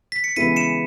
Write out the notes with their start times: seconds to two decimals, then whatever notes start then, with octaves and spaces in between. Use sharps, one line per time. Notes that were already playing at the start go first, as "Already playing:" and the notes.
0.12 B6
0.24 C#7
0.36 C#3 E3 G#3 B3 E4 B6 D#7
0.56 C#7 E7